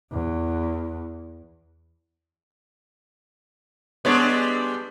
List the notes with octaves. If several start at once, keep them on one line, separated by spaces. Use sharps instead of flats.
E2
G3 G#3 B3 D4 C#5